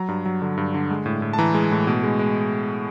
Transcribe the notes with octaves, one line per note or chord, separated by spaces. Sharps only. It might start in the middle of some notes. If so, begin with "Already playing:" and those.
Already playing: F#3 A#5
G2
F#3
D3
G2
D3
G#3
A2
A2
A5
E3 A#5
G#3
A2
B2
G#3
G#3